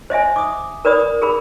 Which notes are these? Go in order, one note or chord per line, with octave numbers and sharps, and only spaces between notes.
C5 D#5 E5 G#5
D6 D#6
A#4 B4 D5 B5 D#6
G#4 A#4 B5